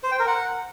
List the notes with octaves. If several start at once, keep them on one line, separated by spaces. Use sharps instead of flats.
C5
G5
A#4
F#5